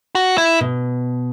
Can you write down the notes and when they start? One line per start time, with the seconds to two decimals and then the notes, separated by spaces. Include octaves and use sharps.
0.15 F#4
0.38 E4
0.60 B2